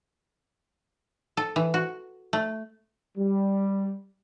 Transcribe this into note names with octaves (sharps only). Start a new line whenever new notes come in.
A4
E3
F#4
A3
G3